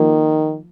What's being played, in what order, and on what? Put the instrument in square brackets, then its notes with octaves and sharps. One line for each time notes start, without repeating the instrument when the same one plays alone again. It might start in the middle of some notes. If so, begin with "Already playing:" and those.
Already playing: [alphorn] D#3 [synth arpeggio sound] F3 A#3